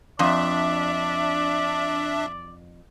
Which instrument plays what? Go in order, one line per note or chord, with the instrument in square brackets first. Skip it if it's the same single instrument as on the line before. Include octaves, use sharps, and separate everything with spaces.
[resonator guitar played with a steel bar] F2 [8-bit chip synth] D4 E5 [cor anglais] D5